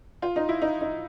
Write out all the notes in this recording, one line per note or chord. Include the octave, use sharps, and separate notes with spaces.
F4
D#4
E4
D#4
D#4